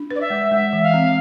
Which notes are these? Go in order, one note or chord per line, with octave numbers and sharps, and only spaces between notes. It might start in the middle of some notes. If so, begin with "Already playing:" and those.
Already playing: D4
B4 D5
E5
G#3
G#3 E5
E3
F5
C4